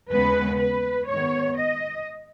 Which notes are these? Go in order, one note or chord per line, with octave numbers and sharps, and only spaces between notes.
D#2 C#3 G#3 B3 B4
B4
G#2 D#3 G#3 B3 C#5
D#5